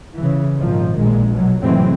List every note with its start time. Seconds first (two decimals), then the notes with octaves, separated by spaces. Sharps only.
0.16 C#3 E3
0.58 G#1 A#2 D#3 F3
0.98 A#1 A#2 G#3
1.32 B2 F#3
1.62 F1 A2 E3 F#3 G#3 C4